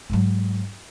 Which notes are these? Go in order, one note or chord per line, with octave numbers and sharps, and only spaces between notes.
G#2 F#3